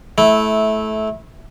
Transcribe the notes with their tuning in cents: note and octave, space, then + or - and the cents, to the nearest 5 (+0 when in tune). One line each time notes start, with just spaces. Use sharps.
A3 -20 E4 -10